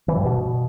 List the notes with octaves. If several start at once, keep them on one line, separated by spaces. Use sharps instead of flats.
E3
G2
B2